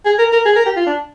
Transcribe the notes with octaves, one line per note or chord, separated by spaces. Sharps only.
G#4
A#4
A#4
G#4
A#4
G4
F4
D4